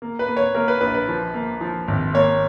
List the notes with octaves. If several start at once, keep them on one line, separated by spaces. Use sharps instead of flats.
A#3
B4
A#3
C#5
A#3 A#4
B4
A#1 B4
B4
F3
A#3
F3
G#1
A#3 C#5